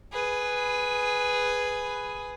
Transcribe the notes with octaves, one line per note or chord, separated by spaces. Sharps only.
G#4 B4